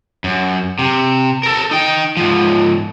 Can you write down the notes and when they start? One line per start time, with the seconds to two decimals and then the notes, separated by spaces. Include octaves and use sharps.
0.24 F#2
0.79 C3
1.43 A4 A#4
1.71 D#4 G5
2.17 G#2 F3